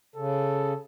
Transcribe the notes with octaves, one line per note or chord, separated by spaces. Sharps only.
C#3 A4